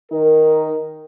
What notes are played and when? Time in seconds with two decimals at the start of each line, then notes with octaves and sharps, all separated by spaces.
0.12 D#3 D#4 A#4